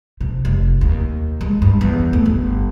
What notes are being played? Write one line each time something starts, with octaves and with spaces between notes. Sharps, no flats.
C3
F1
D#2
G#3
G2
E2
A3
G1